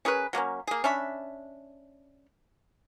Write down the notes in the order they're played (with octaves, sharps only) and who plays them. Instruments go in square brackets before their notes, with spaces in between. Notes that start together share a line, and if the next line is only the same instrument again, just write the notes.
[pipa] C#4 G#4 A#4 B4
F#3 A#3 B3 C#4
A#3 G#4
C#4 D4 E5 B5